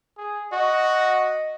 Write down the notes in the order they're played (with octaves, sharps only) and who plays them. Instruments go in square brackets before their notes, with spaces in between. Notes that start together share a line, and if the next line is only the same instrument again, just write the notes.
[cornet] G#4
[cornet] F#4 [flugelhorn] D#5